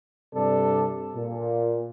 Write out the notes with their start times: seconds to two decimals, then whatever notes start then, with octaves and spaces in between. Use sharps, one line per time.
0.35 G2 C3 D4 A4 D5
1.16 A#2